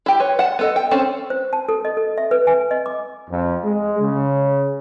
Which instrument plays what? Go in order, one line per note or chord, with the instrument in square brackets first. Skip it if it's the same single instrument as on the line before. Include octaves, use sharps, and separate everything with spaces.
[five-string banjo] E4 G4
B4 C#5
F#5 A5
B3 A4 D#5
G5
C4 C#4 A4 C5
[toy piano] C5
A5
A4
D#5
A4
E5
B4
G#5
D#5
D6
[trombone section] F2
G#3
C#3